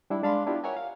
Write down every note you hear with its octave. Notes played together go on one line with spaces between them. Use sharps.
G3 D4 E4
G#3 D4 F5 B5 C6
B3 D4 E4 F4 G4
A#4 C#5 E5 F#5 G#5 A#5
F5